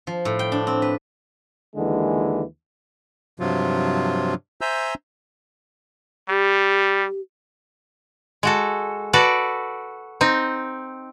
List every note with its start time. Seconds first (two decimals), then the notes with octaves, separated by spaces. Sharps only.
0.07 F3
0.25 A2
0.39 G5
0.52 D4
0.67 C4
0.82 B4
1.76 D#2 D3 E3 G#3
3.40 G2 C3 F3 F#3 F4
4.61 C5 E5 G#5 A#5 E6 G6
6.29 G3 G4
8.43 G#3 F#4 A4
9.13 F#4 A4 B4 D5
10.21 C4 D#4